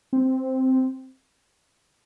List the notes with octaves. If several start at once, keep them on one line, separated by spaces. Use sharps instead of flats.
C4